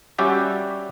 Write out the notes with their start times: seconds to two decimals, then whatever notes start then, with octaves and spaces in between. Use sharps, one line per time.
0.18 G3 C#4 F#4 G4 D5 E5